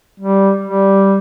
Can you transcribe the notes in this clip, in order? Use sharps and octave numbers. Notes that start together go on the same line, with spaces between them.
G3
G3